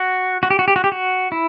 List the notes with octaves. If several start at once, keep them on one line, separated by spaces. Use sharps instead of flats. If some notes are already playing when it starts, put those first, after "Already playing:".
Already playing: F#4
F#4
G4
F#4
G4
F#4
G4
F#4
E4